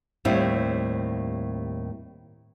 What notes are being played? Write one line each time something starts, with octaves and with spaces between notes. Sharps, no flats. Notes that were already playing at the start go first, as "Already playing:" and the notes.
D#2 A2 G3 C4 E4